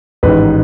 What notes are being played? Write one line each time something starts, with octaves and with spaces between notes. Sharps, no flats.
A1 G#2 D#3 B4